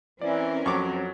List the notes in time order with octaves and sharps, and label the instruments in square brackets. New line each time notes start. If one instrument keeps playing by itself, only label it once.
[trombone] E3 [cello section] C4 C#4 A#4 [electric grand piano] D5
[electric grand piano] F2 [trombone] F#3 [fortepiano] C#6 D6